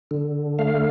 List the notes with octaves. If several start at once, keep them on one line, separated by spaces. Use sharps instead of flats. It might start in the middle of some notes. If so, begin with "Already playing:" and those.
D3
A3 F5